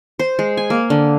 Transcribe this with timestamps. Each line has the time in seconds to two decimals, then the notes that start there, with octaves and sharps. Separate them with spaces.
0.19 C5
0.39 G#3
0.57 G#5
0.70 A#3
0.90 D3